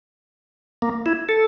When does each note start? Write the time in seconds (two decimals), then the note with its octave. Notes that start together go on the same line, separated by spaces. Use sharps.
0.82 A#3
1.06 E4
1.29 A4